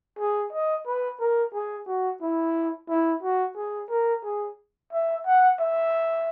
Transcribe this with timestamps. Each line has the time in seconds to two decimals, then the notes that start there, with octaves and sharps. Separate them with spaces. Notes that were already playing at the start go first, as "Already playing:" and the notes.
0.19 G#4
0.52 D#5
0.87 B4
1.20 A#4
1.54 G#4
1.87 F#4
2.22 E4
2.89 E4
3.23 F#4
3.57 G#4
3.90 A#4
4.24 G#4
4.93 E5
5.26 F#5
5.60 E5